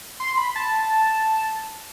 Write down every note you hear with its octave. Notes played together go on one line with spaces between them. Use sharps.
C6
B5
A5